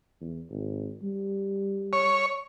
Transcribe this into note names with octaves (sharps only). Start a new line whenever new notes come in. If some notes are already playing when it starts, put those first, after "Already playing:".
E2
G#1
G3
C#5